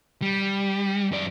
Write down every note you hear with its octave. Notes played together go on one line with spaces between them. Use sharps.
G3
F#2 D5